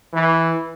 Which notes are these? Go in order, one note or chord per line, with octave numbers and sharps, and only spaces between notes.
E3